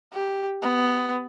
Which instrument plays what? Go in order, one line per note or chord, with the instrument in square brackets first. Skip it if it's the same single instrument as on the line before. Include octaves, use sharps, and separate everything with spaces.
[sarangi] G4
B3